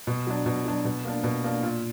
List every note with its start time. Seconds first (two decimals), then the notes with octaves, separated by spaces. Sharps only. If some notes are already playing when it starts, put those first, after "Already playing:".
0.07 B2
0.27 F#3 D4
0.46 B2
0.65 F#3 D4
0.85 B2
1.05 A#3 D4
1.24 B2
1.44 A#3 D4
1.63 A#2